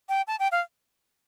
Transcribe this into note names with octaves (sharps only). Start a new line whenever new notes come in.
G5
A5
G5
F5